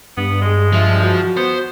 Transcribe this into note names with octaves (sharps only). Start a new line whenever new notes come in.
G2 B3
G#3 G#4
F3 E5
F#4
B3 C5